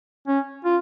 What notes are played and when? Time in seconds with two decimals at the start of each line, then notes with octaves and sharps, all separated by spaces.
0.28 C#4
0.65 F4